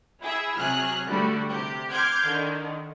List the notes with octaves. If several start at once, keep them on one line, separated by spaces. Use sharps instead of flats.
E4 G#4 E5
C3 F#3 G#4 F6 F#6
D3 G3 A3 F#4
C3 G4
C6 D6 F6 G6 G#6
D3 D#3